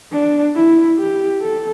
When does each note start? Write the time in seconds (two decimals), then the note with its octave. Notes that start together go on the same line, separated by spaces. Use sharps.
0.12 D4
0.55 E4
0.98 G4
1.41 A4